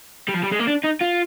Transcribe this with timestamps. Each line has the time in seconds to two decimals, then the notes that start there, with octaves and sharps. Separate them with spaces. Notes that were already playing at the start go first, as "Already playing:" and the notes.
0.28 G3
0.34 F3
0.43 G3
0.51 G#3
0.59 A#3
0.67 D4
0.84 D#4
1.01 F4